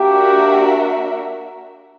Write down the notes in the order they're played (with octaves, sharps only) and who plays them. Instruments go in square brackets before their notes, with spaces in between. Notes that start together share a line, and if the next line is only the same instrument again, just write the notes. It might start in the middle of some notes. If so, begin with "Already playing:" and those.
Already playing: [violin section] A#3 D4 F#4 A#4 E5 [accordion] G4